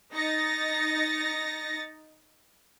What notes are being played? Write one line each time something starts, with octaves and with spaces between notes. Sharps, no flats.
D#4 A6 A#6 C#7